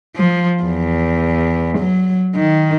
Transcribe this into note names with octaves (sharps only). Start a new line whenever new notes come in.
F3
E2
F#3
D#3